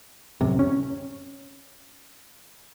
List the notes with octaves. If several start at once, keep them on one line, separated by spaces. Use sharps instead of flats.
D1 F#2 C3
C#4